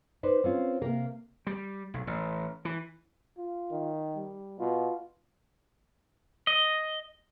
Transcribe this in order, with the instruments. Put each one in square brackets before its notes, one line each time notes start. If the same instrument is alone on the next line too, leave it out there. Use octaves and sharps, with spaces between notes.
[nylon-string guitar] D#4 B4 C5 D5
C4 C#4 F4
C3 A#3 A#4
[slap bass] G3
B1
A1
E3
[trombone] F4
[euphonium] D#3
[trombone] G3
[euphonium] B2 [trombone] F4
[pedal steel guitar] D#5